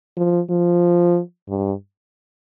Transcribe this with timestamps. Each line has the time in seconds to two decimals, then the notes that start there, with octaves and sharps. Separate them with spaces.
0.17 F3
0.50 F3
1.49 G2